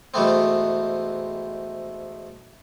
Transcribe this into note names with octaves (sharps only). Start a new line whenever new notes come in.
G#2 B2 E3 A3 B3 C4